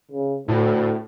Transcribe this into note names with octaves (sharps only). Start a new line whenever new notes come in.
C#3
D2 A2